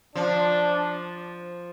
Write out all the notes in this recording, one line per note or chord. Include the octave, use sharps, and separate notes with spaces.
F3 D4